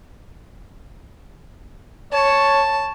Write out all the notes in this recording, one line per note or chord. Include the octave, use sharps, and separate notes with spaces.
C#5 A5